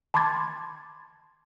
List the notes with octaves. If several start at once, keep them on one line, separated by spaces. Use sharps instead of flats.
A5 B5 C6 D6 G#6 A6